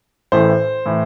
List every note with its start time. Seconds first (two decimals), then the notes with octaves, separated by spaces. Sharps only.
0.32 A1 A2 E3 A3 C5
0.86 A2 E3